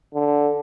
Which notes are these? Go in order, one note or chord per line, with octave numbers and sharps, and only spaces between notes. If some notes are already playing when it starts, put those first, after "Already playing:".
D3